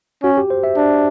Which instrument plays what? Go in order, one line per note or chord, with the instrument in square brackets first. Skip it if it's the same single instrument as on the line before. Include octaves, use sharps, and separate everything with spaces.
[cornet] C#4 [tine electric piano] F#4
[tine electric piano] G4
C5
E5
[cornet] D4